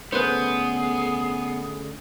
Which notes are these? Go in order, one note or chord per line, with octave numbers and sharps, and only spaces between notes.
D3 A3 B3 C#4 G#4 B4 C5